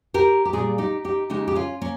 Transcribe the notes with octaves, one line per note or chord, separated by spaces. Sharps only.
G4 A#4
G4
A#2 G3 F4 G#4
D#4 G4
D#4 G4
C#3 G#3 D#4 G4
G4
C#4 F4
A#3 C#4